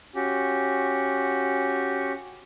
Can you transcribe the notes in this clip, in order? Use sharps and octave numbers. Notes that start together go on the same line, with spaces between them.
C#4 F#4 G4